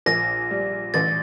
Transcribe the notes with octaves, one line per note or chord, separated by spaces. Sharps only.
A#1 A#6
G3
A1 A6